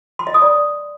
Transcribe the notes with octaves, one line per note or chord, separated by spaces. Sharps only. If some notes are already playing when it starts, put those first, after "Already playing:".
C6
D#5
D#6
D5